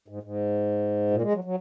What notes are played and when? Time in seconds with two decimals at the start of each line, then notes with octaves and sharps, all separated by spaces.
0.08 G#2
0.23 G#2
1.11 A#2
1.22 G#3
1.33 F#3
1.44 F#3